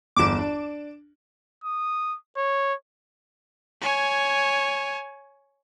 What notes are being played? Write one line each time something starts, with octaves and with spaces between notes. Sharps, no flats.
G1 E2 D6 D7 E7
D4
D#6
C#5
C#5 G#5